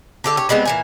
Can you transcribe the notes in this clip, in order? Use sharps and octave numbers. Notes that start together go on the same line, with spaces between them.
D3 G4 A4
G4 C#5
G3 G#3 B3 C4
A#2 E3 G#5